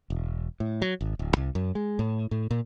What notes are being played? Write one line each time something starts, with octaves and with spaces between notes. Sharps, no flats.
E1
A2
F#3
G#1
D1
C2
F#2
G#3
A2
A2
A#2